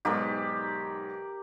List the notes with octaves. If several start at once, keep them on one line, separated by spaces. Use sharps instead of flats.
B1 G#2 G4 A#4 D5